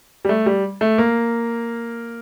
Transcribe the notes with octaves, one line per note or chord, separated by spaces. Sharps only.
G3
A3
G3
A3
A#3